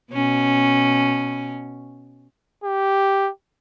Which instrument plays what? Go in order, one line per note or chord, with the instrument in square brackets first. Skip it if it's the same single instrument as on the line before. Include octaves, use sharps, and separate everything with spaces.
[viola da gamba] B2 C#4
[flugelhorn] G4